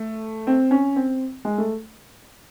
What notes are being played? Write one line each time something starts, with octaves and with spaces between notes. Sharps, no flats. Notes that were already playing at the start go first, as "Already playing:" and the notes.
Already playing: A3
C4
C#4
C4
G#3
A3